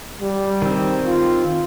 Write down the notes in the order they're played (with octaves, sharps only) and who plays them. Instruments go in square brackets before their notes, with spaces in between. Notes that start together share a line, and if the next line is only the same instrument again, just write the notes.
[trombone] G3
[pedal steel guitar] D#3 C4
[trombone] F4